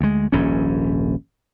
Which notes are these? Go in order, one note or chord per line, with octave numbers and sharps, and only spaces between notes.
D2 G#3
D#1 A#1 G#2 C#4